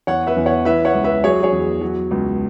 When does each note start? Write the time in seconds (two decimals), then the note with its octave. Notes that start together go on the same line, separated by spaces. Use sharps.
0.07 E2 C#5 F#5
0.27 B4 E5
0.36 E2
0.46 C#5 F#5
0.65 E3 B4 E5
0.85 C#5 F#5
0.94 C#2
1.04 B4 E5
1.24 F#3 G#4 C#5
1.43 G#4 C#5
1.52 E2
1.81 F#3
2.11 C#2